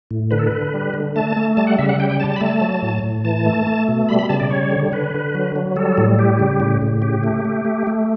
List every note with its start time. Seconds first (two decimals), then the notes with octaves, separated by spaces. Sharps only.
0.11 A2
0.31 D3 B4
0.39 A4
0.47 D3 B4
0.74 G3
0.94 D3
1.16 A3 A5
1.36 A3
1.57 G3 A5
1.67 F#5
1.78 C#3 E5
1.89 F#5
1.99 G3 G5
2.10 G5
2.20 G3 A5
2.30 A5
2.36 B5
2.40 A3 A5
2.61 F#3
2.82 A2
3.03 A2
3.24 E3 A5
3.46 A3
3.67 A3
3.88 B2
4.09 G3 B5
4.19 B5
4.29 C#3 A5
4.40 D5
4.50 G3 C#5
4.72 D3
4.92 D3 B4
5.14 D3
5.34 F#3
5.56 F#3
5.76 G3 A4
5.98 A2
6.19 G3 G4
6.39 C#3
6.60 A2
6.82 A2
7.02 C#3 G4
7.23 A3
7.45 A3
7.65 A3
7.87 A3